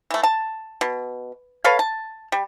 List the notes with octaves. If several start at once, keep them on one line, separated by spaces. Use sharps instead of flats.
E3 A3
A5
B2
A4 B4 C#5 F5
A5
G3